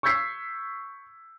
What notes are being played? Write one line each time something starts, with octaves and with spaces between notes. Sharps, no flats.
C#6 E6 G6 G#6 B6 C7